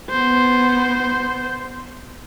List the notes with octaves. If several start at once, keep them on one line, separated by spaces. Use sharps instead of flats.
B3 C5